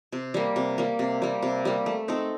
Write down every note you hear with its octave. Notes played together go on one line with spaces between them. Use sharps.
C3
G3 A#3
C3
G3 A#3
C3
G3 A#3
C3
G3 A#3
A3
C4 D#4 A4